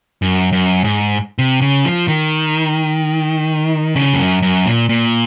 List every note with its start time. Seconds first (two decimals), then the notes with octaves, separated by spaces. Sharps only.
0.22 F#2
0.52 F#2
0.84 G#2
1.39 C3
1.62 C#3
1.85 F3
2.08 D#3
3.96 C#3
4.14 F2
4.19 F#2
4.42 F#2
4.66 A#2
4.89 A#2